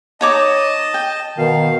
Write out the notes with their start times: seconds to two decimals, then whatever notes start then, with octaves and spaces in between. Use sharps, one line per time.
0.21 D#4 C#5 D#5 A5 D6
0.94 G5
1.38 B2 D#3 F5